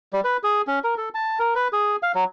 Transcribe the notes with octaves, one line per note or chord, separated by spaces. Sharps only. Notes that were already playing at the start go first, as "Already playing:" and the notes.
G3
B4
G#4
C#4
A#4
A4
A5
A#4
B4
G#4
F5
F#3